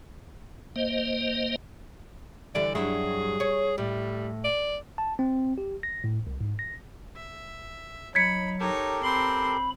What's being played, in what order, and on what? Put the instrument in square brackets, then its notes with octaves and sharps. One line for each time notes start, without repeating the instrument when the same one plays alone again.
[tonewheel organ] A#3 C5 D#5
[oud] D3 E3 G3 [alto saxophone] D5
[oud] G2 F#3 E4 [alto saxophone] G#4
[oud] C#5
[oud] A2 [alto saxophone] G3
[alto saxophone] D5
[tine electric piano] A5
C4
G4
A#6
A2
C2
G#2
A#6
[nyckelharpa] E5
[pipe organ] F#3 [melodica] D#4 [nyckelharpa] B5 [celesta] G#6 B6 C#7
[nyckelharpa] D#4 C#5 [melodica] G4 A4 A#4
[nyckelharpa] C4 C6 [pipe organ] B5